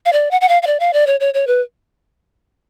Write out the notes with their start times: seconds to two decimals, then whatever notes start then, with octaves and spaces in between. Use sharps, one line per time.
0.06 F5
0.13 D5
0.31 F#5
0.41 F#5
0.49 F5
0.62 F5
0.67 D5
0.80 F5
0.93 D5
1.07 C#5
1.20 C#5
1.34 C#5
1.47 B4